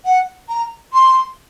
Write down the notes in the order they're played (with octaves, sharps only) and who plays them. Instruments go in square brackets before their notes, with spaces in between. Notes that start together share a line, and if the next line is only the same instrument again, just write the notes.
[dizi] F#5
A#5
C6